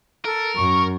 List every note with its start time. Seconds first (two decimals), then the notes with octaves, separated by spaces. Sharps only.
0.25 A4 A#4
0.56 F#2 C#6